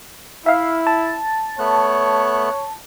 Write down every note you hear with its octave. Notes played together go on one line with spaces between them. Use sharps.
E4 E5 F5
A5
A3 B3 C#5 F#6